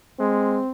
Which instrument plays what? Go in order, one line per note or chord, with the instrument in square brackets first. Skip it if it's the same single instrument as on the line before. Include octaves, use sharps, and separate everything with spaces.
[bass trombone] G#3 [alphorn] C4